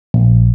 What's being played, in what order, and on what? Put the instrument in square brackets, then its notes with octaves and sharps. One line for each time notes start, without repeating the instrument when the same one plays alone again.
[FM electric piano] A#1